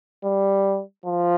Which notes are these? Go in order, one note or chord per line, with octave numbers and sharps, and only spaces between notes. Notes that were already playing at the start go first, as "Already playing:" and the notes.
G3
F3